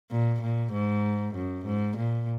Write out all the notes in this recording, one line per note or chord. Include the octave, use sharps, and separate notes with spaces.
A#2
A#2
G#2
F#2
G#2
A#2